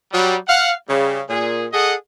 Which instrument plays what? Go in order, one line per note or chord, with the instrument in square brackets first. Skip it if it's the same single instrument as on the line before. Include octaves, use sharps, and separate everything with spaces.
[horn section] F#3 G3
F5 F#5
C#3 G3
A#2 G#4
G#4 A4 D#5 F#5